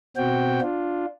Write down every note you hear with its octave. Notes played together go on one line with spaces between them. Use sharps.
B2 C4 F#4 G5
D4 F4